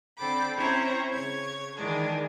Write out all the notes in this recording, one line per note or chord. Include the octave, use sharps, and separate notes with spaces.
D3 C4 A4 G5 B5 D6
C4 C#4 E4 C5 C#5 A#5
C#3 C#5 G#6
D#3 E3 G#3 D4 G#4